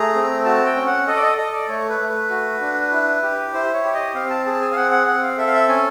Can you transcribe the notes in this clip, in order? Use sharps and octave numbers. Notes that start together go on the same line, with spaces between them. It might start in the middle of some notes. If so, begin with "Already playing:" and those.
Already playing: A3 G#4 A#5
C4
F#4 A5
G5
C#4
F#5
A4 D#5
D5
D#5
A4 D#5
D5
A3 C#5
B4
A3
B4
F#4
D4
E4
G4
E4 C5
C#5
G4
D#5
C4 F5
A5
G#4 A5
G#5
F5
C4 F#5
F#5
C4 F#5
F5
A4 E5
F5
E5
C#4 G#5